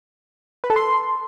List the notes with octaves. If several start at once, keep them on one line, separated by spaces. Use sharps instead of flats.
B4
A4
C6